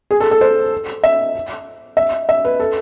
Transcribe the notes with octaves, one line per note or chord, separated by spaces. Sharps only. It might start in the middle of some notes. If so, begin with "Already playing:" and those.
G#4
A4
A4
C5
E5
E5
E5
B4
A4